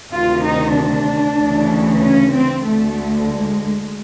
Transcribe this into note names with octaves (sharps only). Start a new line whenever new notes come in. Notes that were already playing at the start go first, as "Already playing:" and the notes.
D2 C3 D#3 F4
D#4
D4
D2 C#3 E3
C#4
C4
D2 D3 A3
G#3